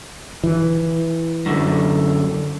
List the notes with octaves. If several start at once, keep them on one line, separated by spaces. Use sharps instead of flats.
E3
F#2 D3